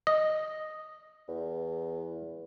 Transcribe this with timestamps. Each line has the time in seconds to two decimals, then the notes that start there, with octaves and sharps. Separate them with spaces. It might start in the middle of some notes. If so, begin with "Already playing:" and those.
0.07 D#5
1.28 E2